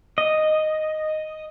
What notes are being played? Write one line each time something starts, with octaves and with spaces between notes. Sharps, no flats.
D#5